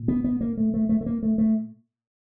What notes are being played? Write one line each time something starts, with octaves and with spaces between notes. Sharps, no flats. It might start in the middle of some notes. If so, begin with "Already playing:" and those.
Already playing: A#2
B3
B3
A#3
A3
A3
A3
A3
A#3
A3
A3